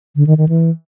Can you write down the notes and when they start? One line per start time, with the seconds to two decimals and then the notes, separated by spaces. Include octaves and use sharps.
0.16 D3
0.27 D#3
0.38 D#3
0.49 E3